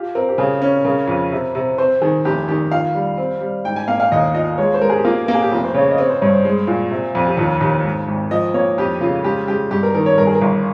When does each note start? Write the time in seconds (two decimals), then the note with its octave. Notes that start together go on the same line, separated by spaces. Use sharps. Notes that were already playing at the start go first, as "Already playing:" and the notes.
Already playing: F4 G4
0.15 C4 A#4
0.29 G4
0.38 C#3 G#4
0.62 C#4
0.84 C#3 A#4
1.08 F2
1.32 C3
1.55 C3
1.78 C4 C5
2.02 D#3 G#4
2.25 F1 G4
2.48 D#3 G4
2.72 F4 F5
2.95 G3
3.18 C4
3.41 G3
3.65 G#2 G5
3.76 G#5
3.88 A#3 F5
4.00 F5
4.12 D#2 D#5
4.34 F4 D#5
4.58 G#3 C#5
4.74 C5
4.81 G#3 A#4
4.90 G#4
4.97 G4
5.05 A#3 F4
5.26 A#3 A#4
5.35 G#4
5.42 G4
5.51 F1 F4
5.64 C5
5.74 C#3 C#5
5.91 D#5
5.98 C4 C#5
6.10 C5
6.21 G2 C#5
6.34 C5
6.45 G#3
6.67 A#2
6.91 C3
7.15 F2
7.27 G4
7.37 D#2 F4
7.61 D#2 G4
7.84 G#2
8.08 G#1
8.31 F3 D#5
8.54 A#3 C#5
8.78 F2 G4
9.01 C#3 F4
9.24 G#3 G4
9.47 G#3 G4
9.71 G2 G4
9.83 A#4
9.94 D#3 A#4
10.06 C#5
10.18 G2 A#4
10.27 G#4
10.35 A#4
10.41 G1